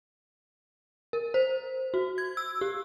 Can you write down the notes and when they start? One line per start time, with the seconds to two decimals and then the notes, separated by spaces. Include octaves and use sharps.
1.13 A#4
1.34 C5
1.94 F#4
2.18 G#6
2.37 E6
2.61 G4